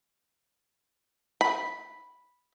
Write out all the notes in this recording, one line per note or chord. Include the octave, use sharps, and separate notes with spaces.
B5